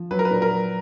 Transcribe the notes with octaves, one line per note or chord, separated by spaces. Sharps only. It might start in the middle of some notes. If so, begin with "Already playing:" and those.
Already playing: F3
F#3 B4
A#4
B4
A#2
A#4
F#3